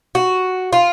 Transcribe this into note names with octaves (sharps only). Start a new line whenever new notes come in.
F#4
F4